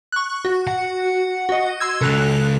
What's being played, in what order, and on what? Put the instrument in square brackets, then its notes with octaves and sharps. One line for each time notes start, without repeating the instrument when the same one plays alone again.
[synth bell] C#6 F#6
F#4
[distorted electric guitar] F#5
[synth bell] F#4 D#5
C6 E6 G#6
[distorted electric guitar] C#2 C#3 [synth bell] A4 F#6 F7